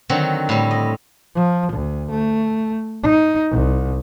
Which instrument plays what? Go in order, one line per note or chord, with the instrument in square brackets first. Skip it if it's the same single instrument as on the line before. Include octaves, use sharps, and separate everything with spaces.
[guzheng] D3 D#3 F#3 C4 F#4
A2 G3
D#5
[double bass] F3
D2
A3
D#4
C2